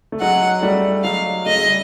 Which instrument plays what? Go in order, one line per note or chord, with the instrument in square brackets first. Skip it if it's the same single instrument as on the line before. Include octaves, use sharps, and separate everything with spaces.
[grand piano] A3
[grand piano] F#3 G#3 [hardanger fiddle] F#5
[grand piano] G3 A3
[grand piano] F#3 G#3 [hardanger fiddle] F5
[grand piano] A3 [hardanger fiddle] D#5
[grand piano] G#3
G3